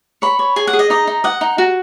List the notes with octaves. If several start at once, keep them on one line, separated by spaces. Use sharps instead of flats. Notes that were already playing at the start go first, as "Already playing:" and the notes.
C#5 B5
C#5
G#4 G#5
F#5
G#4
D#5
D#4 D#5
D#4
D#5 F#5
D#4
F#4